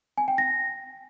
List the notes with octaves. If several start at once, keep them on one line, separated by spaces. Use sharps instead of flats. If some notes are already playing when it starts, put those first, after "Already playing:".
G#5
G5
A#6